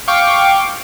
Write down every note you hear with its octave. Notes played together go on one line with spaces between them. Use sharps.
F5 G5 C#6 D6